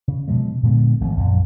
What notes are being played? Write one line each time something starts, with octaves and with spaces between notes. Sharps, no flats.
C#3
B2 F3 F#3 G#3
A#2 D3 G#3 B3
G#1 F3 A3 C4
A#1 F#2